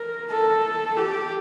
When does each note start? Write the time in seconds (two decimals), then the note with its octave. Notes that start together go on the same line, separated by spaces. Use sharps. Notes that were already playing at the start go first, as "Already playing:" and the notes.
Already playing: A#4
0.31 A4
0.97 G4